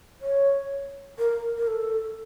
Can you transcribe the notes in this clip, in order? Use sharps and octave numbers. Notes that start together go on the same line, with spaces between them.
C#5
A#4
A#4
A4